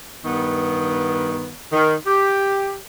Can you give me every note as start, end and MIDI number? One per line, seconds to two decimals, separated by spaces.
0.24 1.53 43
0.24 1.53 51
0.24 1.53 59
1.73 1.95 51
2.07 2.77 67